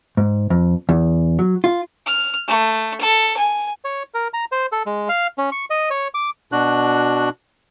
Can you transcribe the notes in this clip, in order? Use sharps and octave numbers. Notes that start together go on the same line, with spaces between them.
G#2
F2
E2
F#3
F4
F6
A3
A4
G#5
C#5
A#4
A#5
C5
A4
G#3
F5
C#4
C#6
D#5
C#5
D6
B2 D4 F#4 F#6